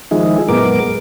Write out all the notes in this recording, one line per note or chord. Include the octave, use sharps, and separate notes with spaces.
D#3 F3 G#3 D#4 E4 G#4
F#2 A#2 G#3 B3 A#4 D6